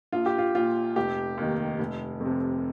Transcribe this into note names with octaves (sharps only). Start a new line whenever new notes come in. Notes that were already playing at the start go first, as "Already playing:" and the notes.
A#1 F4
G4
F4
A#2 F4
F1 G4
D#2 D#3
F1
F2
C3